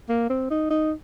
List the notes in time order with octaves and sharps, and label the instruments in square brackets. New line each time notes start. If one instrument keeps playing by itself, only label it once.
[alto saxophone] A#3
C4
D#4
D#4